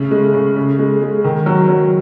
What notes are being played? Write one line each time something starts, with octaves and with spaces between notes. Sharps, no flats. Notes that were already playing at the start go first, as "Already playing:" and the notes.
Already playing: C#3 A3
G#3
C#3
C#3
G#3
G#3
D#3
F#3
F#3